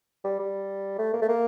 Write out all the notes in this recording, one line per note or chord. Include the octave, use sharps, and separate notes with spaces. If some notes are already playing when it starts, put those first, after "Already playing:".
G3
G3
A3
A#3
A3
A#3